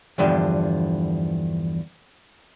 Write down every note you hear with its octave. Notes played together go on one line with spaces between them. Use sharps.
E2 G2 D3 F3